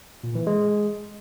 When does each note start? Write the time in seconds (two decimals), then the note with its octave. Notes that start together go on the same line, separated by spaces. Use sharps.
0.24 A#2
0.35 E3
0.47 G#3